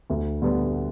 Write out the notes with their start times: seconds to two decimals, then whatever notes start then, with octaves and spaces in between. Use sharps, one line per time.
0.10 D2
0.42 D3 G3 B3